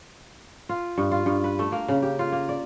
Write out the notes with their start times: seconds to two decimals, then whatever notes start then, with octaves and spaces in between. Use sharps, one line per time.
0.69 F4
0.98 G2
1.11 F4
1.26 G2
1.44 B4
1.59 A3
1.72 A#3
1.88 C#3
2.03 G4
2.19 F4
2.32 A#3
2.49 D5